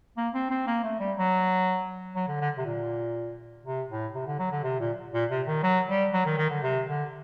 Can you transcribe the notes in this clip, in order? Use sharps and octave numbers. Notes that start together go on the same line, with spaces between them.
A#3
C4
C4
A#3
A3
G3
F#3
F#3
D3
D3
C3
A#2
C3
A2
C3
D3
F#3
D3
C3
A#2
A#2
C3
D#3
F#3
G3
F#3
D#3
D#3
D3
C3
D3